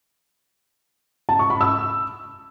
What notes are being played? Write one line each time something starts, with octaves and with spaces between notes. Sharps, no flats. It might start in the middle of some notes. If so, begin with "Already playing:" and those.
A5
C#6
B5
E6